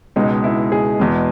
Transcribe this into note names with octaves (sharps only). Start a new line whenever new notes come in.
C#2 B2 G#3 D#4
E4
G#4
E2 B2 G#3